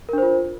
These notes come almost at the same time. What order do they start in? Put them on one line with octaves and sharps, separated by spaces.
A#4 D4 C5 F4